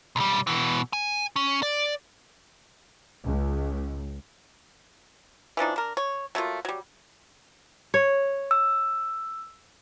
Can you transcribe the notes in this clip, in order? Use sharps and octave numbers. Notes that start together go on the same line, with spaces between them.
B1 G3
B2 E3
G#5
C#4
D5
C#2
E3 F3 D4 D#4
D4 A#4
C#5
F#3 A3 A#3 F4
F#3 G3
C#5
E6